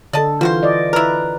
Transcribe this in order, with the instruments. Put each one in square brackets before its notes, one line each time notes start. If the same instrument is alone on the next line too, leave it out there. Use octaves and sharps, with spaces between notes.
[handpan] D3 A4 [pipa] D5 D#5 A5
[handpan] E3 F4 [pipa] G3 F#4 C5
[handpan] D5 D#5
[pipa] E4 A#4 [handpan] B4